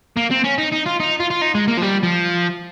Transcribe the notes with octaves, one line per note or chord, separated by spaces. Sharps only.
A#3
C4
C#4
D#4
D#4
F4
D#4
F4
F4
D#4
G#3
A#3
F3
G3
F3